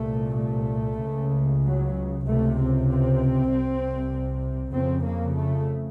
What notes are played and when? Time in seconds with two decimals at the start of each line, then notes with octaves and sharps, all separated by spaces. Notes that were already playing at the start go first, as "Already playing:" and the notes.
Already playing: C2 A#2 A3
0.40 A3
1.02 C#2 C#3
1.64 F#3
2.26 C#2 C3 A3
2.57 C4
2.89 C4
3.51 C2 C3
4.75 F2 C#3 C4
5.06 A#3
5.37 A3